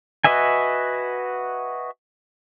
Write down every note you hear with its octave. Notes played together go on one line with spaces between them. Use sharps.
F#4 B4 D#5 E5 G#5